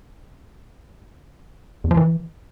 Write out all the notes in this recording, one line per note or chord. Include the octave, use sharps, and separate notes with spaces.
E2
F3
E3